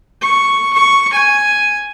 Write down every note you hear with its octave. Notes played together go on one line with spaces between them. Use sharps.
C#6
C#6
G#5